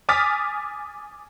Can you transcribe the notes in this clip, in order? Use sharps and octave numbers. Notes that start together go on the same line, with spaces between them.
G#5 D6 D#6 F6 A6 B6